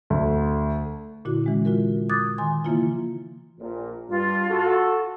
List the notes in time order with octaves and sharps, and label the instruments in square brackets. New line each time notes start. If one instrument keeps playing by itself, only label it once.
[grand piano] D2
[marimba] A#2 D3 E4 F#4
E3 G#3 C#4
F4 F#4 A#4
D6 D#6 F#6 G#6 A6
D#3 G#5 C6
C#3 E3 F3 A#3 E4 F4
[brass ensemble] A#1 A#2
[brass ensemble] G2 [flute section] F4
[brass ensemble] F#4 A4